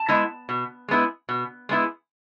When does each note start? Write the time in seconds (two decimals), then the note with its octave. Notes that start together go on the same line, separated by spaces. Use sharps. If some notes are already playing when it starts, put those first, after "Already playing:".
Already playing: A5
0.08 G#3 B3 E4
0.49 B2
0.88 G#3 B3 E4
1.29 B2
1.69 G#3 B3 E4